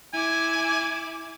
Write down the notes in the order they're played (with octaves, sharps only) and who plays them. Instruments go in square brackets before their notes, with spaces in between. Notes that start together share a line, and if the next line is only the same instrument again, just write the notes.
[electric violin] E4 D6 [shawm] G#5